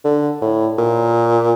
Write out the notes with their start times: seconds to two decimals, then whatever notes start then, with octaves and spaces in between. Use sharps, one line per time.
0.05 D3
0.41 A2
0.78 A#2